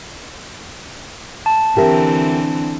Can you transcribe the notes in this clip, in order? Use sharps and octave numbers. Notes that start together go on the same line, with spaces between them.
A5
D3 E3 C4 G4 A#4 E5